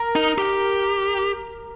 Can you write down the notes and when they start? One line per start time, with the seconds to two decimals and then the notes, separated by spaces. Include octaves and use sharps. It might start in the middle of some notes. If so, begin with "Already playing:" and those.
Already playing: A#4
0.16 D#4
0.38 G4